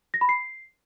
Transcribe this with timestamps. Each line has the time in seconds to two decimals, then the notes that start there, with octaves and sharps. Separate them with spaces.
0.14 A#6
0.21 B5
0.29 C7